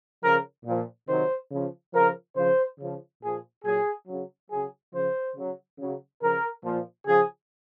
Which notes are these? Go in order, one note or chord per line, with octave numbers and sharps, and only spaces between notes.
C#3 F3 A#4
A#2 F3
C3 D#3 F#3 C5
C#3 F3
C#3 F3 A#4
C#3 F3 C5
C#3 F3
A#2 F3 G#4
A#2 F#3 G#4
C#3 F#3
C#3 F#3 G#4
C#3 F3 C5
C#3 F#3
C#3 F#3
C#3 F3 A#4
A#2 F3
C#3 F3 G#4